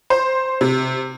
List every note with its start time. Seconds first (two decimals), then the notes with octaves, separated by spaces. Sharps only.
0.10 C5
0.61 C3